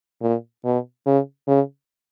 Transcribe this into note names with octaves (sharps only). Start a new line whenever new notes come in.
A#2
B2
C#3
C#3